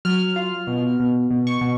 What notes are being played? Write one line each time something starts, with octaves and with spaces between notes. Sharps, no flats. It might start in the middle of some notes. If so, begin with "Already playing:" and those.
F#3 F6
F4
B2
B2
B2
C#6
B2